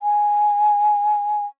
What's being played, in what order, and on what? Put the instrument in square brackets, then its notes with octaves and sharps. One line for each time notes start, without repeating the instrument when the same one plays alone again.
[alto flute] G#5